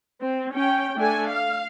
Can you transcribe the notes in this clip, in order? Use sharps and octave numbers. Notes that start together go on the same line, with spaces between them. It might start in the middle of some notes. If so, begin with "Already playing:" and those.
C4
C#4 G5
A3 D4 A4 G#5
F5